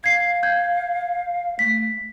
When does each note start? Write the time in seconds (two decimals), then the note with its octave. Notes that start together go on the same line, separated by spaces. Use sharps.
0.04 F5 G#6 C7
0.43 G6 G#6
1.59 A3 B6